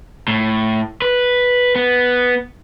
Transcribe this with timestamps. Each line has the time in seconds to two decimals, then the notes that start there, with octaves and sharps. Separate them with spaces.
0.28 A2
1.02 B4
1.76 B3